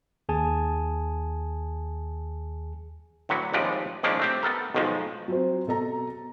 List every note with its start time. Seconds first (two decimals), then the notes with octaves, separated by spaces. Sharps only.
0.29 D#2 G#4 G#5 A5
3.29 A2 D3 F#3 B4 F#5
3.53 D#2 C3 F3 G#3 B4 D5
4.03 D#3 F3 G#3 A#3 C#4 D4
4.19 A3 C4 G4
4.43 B3 A4 A#4
4.75 B1 B2 D#3 F3 G#3
5.28 F#3 C4 C5
5.67 B2 A4 A#5